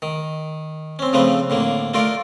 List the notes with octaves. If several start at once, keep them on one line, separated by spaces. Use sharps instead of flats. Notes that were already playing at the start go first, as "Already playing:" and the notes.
D#3
C4 C#4
C#3 F3 A3 C4 B4
A2 D3 A#3
A3 F4 A#4 D5